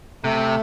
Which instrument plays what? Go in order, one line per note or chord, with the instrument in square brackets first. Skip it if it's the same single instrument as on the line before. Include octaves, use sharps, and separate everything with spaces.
[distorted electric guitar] C3 [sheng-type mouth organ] A3